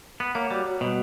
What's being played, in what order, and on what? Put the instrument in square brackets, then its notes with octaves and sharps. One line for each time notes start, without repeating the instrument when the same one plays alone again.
[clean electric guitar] B3 [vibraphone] F#5
[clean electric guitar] A#3 [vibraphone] C#5
[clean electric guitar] G3 [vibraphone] F#4
[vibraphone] F#4
[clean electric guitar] B2 [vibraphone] G3